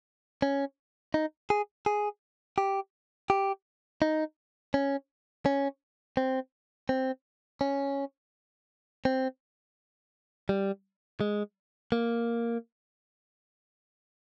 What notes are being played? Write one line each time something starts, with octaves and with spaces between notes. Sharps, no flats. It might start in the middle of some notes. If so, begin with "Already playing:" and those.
C#4
D#4
G#4
G#4
G4
G4
D#4
C#4
C#4
C4
C4
C#4
C4
G3
G#3
A#3